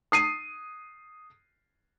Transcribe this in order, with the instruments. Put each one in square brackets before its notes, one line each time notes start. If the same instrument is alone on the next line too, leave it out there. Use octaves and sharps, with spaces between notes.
[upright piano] D#6 C7 D#7